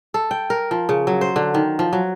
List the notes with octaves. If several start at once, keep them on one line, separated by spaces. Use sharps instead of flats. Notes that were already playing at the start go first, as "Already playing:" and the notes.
A4
G5
A#4
F3
C#3
F#3
C5
D3
D#3
F3
F#3